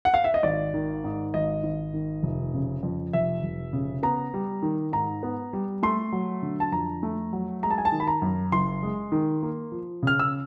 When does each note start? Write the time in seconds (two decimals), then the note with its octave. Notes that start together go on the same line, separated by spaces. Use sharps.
0.05 F#5
0.14 F5
0.24 E5
0.34 D#5
0.43 G#1 D5
0.74 D#3
1.04 G#2
1.34 G#1 D#5
1.63 G#1
1.94 D#3
2.23 F1
2.54 C#3
2.83 F2
3.13 F1 E5
3.43 F1
3.73 C#3
4.03 B3 A#5
4.34 G3
4.62 D#3
4.92 G#2 A#5
5.23 B3
5.53 G3
5.83 A3 C6
6.12 F#3
6.42 D3
6.60 A5
6.72 F2 A#5
7.03 A3
7.33 F#3
7.63 G#3 A#5
7.70 A5
7.78 G#5
7.85 A5
7.92 D#3
8.00 B5
8.07 A#5
8.22 F#2
8.52 F#1 C6
8.83 G#3
9.12 D#3
9.43 A#3
9.72 F3
10.03 C#3 F6
10.19 E6